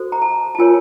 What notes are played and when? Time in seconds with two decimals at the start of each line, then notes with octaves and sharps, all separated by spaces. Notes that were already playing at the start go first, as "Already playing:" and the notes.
Already playing: F#4 A4 C5
0.12 A#5
0.22 A5
0.55 A5
0.59 F4 A#4 C#5 G#5